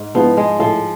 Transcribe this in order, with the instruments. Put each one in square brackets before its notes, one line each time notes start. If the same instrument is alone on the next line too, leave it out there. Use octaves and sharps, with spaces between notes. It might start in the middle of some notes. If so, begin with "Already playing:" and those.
Already playing: [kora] G#2
[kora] F3 [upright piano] G#3 B3 E4 G#4
[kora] G#3
[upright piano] A2 [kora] F3